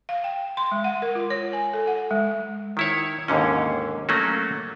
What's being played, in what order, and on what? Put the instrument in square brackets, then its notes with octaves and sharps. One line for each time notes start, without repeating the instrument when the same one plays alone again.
[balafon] F5
G5
C6
G#3
F#5
A#4
F4
C#5
G#5
A4
F#5
G#3
[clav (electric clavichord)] D#3 E4 C#5
D#2 G#2 D3 C#4
F#3 A3 A#3 C#4 F#4